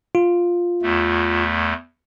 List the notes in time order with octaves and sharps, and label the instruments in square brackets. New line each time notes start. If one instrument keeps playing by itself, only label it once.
[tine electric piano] F4
[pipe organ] E2 A3